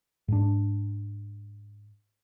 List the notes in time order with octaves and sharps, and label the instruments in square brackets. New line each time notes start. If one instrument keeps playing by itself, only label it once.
[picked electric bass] G#2 D4